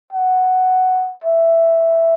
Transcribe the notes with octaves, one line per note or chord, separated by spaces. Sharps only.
F#5
E5